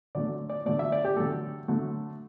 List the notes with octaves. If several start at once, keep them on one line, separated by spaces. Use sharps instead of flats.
D3 F#3 A3 D5
D5
D3 F#3 A3 D5
E5
D5
G4
D3 F#3 A3 A4
D3 F#3 A3